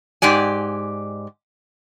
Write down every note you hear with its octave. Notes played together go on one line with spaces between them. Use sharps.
G#2 G4 D5 G#5